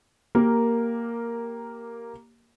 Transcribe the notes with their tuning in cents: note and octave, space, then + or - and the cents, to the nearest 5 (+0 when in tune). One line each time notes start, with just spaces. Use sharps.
A#3 +0 G4 +0 A#4 -5